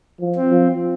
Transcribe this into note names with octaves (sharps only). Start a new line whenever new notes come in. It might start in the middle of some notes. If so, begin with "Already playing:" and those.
F3
C4
F3